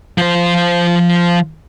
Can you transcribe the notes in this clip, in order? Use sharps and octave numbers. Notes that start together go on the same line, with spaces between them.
F3 C5